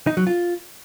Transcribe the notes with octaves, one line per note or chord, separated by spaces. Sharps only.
D#4
F#3
F4